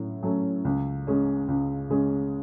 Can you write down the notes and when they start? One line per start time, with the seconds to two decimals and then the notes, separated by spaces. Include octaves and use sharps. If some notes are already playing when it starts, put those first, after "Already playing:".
Already playing: A2 F#3 C#4
0.23 F#3 A3 C#4
0.65 C#2
1.07 C#3 G#3 C#4
1.48 C#2
1.90 C#3 G#3 C#4